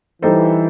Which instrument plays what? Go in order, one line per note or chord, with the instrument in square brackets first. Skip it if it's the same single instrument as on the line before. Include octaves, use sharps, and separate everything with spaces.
[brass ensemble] E3 [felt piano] G3 D#4 A4 C5